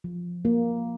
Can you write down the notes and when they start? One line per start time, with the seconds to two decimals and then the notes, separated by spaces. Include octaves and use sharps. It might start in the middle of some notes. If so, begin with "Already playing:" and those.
0.04 F3
0.45 A#3